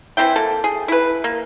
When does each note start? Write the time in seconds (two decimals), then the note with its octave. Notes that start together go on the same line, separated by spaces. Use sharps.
0.17 E3 C4 E4 G5
0.36 A#3 A4
0.64 G#4
0.88 E4 B4
1.24 A#3